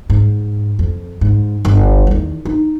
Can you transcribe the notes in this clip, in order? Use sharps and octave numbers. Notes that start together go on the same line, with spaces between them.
G#2
F2
G#2
G1
E2 D#3
D#4